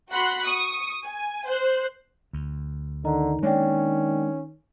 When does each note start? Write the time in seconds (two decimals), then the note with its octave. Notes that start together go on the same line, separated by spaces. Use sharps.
0.10 F#4 F#5 B5 C6 F#6
0.44 C#6 D#6
1.04 G#5
1.48 C5 F#6
2.33 D2
3.05 D3 D#3 D#5 A#5
3.43 G#3 A#3 C#4 D4 C#5 D5 G5